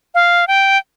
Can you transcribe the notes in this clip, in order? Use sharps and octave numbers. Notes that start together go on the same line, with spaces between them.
F5
G5